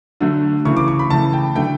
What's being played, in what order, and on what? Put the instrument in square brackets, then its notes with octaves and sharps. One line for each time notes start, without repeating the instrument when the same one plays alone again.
[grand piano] D3 F#3 A3
C#3 E3 A3 C#6
D6
C#6
B5
C#3 E3 A3 A5
G5
D3 F#3 A3 G5